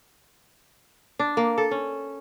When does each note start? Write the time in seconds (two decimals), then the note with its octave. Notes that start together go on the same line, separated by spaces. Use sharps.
1.19 D4
1.37 A#3
1.58 A4
1.71 C#4